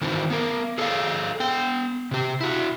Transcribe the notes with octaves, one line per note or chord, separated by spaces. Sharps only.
D#3 E3 C4 D#4 F#4
B3 A#4
G#4 A4 C#5 D#5 F5
B3 G5
C3 G4
E4 F#4